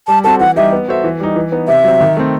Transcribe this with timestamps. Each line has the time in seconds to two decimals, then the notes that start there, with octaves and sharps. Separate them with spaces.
0.08 G3 A5
0.24 C4 F#4 A4 A5
0.40 E3 F#5
0.56 G3 D#4 G4 D#5 E5
0.72 B3
0.88 F#4 A4 C5 E5
1.04 E3
1.20 G3 D#4
1.36 E3
1.52 B3 D#4
1.68 C3 E5
1.84 F#3 C4
2.00 D#3
2.17 A3 C4